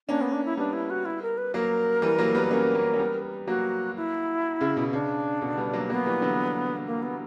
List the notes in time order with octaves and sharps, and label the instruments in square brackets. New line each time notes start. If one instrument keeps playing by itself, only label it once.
[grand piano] A#3 C#4 [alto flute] D4
[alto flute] B3
D4
E4
[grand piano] G3 B3 [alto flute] D4
[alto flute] E4
F#4
E4
A#4
B4
[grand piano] F#3 A#3 [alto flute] A#4
[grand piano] E3 G3
F#3 A#3
G3 B3
[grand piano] A#3 C#4 [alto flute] A#4
[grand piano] A#3 C#4
C#4
G3 B3
[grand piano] F#3 A#3 [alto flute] F#4
[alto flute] E4
[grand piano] C#3
B2
[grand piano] C#3 [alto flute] D4
[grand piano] B2 D3
G3 B3
F#3 A#3
[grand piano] F#3 A#3 [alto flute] B3
[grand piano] E3 G3
D3 F#3
[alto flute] A#3
B3